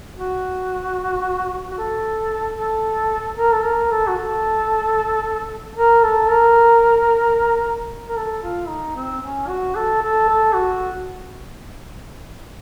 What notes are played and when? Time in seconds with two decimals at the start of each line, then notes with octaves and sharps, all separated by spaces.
0.18 F#4
1.71 F#4
1.78 A4
2.58 A4
3.37 A#4
3.53 A4
3.64 A#4
3.91 A4
4.08 F#4
4.18 A4
5.77 A#4
6.03 A4
6.30 A#4
8.09 A#4
8.16 A4
8.43 F4
8.68 D#4
8.96 C4
9.22 C#4
9.48 F#4
9.75 A4
10.02 A4
10.29 A4
10.55 F#4